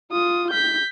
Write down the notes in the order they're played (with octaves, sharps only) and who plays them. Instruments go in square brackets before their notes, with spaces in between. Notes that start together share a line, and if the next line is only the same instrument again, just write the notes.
[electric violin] F4 D#6
G6 B6